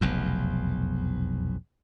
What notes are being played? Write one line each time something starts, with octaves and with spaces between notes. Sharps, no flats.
F1 B1 E2